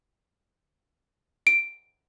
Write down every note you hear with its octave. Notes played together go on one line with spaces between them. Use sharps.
D7